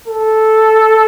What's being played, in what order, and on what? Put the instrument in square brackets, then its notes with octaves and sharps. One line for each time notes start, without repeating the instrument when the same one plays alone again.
[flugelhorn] A4